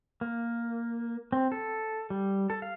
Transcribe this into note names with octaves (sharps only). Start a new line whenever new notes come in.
A#3
C4
A4
G3
A4
F5